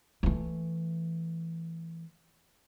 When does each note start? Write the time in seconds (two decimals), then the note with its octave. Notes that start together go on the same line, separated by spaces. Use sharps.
0.23 E3 A3